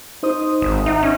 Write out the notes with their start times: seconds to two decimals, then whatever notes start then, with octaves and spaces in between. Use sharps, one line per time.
0.23 D#4 C5 D#6
0.62 G#1
0.86 D#4 E5 F#5
1.03 C#4